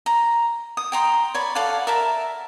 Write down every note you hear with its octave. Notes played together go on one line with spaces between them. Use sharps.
A#5
D#6
G5 A#5 C6
C#5 D5 B5
A4 D5 F5 F#5
A#4 E5 A5